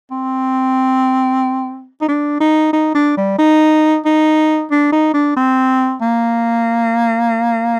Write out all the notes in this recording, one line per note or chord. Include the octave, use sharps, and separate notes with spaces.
C4
D#4
D4
D#4
D#4
D4
G3
D#4
D#4
D4
D#4
D4
C4
A#3